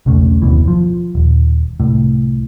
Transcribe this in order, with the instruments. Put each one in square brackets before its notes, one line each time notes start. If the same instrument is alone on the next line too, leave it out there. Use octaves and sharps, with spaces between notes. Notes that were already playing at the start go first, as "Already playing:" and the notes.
[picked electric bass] B1 E2 C#3 A3
F#1 D#2 B2 E3
F3
D#1
C2 A2